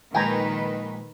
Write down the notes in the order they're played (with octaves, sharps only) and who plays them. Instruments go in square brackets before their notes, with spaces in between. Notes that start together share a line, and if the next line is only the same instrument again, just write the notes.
[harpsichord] A#1 G#3 [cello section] D#3 D#4 B4 [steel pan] G5 G#5 A#5